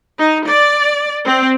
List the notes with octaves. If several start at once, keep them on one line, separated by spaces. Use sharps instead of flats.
D#4
D5
C4